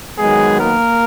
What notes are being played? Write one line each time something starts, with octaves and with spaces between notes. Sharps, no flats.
D#3 F#3 G#3 B3 G#4
A#3 A#4